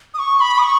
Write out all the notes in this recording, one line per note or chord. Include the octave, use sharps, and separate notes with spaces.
D#6
C#6
C#6
B5
D#6
C#6